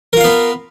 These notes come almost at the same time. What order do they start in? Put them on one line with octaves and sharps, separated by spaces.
A#4 F4 F5 B3